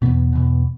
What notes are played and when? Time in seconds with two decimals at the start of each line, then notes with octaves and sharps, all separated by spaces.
0.02 E2 B2 B3
0.33 E2 B2